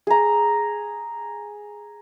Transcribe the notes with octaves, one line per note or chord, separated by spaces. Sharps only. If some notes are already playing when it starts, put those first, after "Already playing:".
G#4 A#5